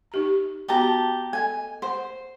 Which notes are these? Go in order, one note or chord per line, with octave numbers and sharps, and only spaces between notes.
D#4 G4 A#5
B3 F#4 G4 A5 A#5
A4 D#5 G#5
C5 F#5